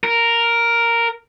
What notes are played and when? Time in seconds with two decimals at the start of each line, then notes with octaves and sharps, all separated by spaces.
0.04 A#4